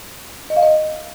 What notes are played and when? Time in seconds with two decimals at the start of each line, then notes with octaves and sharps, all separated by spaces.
0.50 D#5
0.56 F5
0.63 D#5